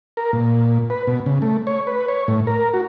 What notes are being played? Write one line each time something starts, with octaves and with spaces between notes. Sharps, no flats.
A#4
A#2
B4
B2
C#3
A3
C#5
B4
C#5
A2
A#4
F#4